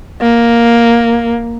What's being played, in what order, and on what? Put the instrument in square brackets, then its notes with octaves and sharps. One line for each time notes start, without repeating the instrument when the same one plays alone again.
[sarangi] A#3